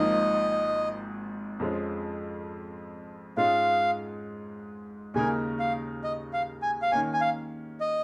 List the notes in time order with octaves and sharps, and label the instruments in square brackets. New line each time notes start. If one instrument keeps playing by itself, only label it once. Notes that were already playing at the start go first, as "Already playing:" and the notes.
Already playing: [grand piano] G#1 G#2 F3 A#3 D#4 [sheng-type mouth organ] D#5
[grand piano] F2 F3 G#3 C#4
[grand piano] G#2 G#3 C#4 F4 [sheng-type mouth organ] F5
[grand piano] D#2 C#3 A#3 D#4 A#4 [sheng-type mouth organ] G#5
[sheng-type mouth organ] F5
D#5
F5
G#5
F5
[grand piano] D#3 A#3 C#4 [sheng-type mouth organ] G#5
[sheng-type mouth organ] G#5
F5
D#5